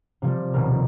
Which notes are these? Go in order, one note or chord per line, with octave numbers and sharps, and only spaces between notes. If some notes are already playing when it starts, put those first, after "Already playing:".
C3 F3 G3
D#1 B2 A#4